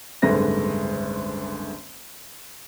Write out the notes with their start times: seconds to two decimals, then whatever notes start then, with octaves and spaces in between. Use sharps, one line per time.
0.22 F#1 C2 G#2 D3 B4 A#6